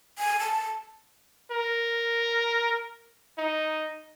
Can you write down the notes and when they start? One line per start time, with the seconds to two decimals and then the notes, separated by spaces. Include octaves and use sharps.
0.18 G#5
0.40 A5
1.51 A#4
3.38 D#4